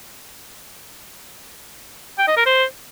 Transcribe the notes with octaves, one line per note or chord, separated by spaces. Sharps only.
G5
D#5
A#4
C5